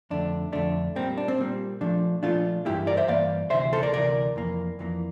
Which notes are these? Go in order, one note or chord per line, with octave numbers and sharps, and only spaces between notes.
F2 D3 A3 D4
F2 D3 A3 D4
A#2 G3 A#3 C4
D4
C4
A#2 G3 A#3
A#2 F3 A3 D4
A#2 F3 A3 D4 F4
G2 E3 A#3 E4 G4
A#4 D5
C5 E5
G2 E3 A#3 D5 F5
D2 C3 E3 C5 E5
A4 C5
A#4 D5
D2 C3 E3 A#4 D5
F2 E3 A#3
F2 E3 A#3